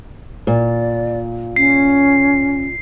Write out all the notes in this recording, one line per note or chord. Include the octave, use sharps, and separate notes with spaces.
A#2 D5
C#4 C7